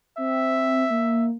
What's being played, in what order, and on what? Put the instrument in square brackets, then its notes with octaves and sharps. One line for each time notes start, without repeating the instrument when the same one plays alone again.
[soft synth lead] C4 [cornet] E5
[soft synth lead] A#3